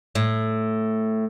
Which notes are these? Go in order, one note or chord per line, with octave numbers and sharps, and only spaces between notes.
A2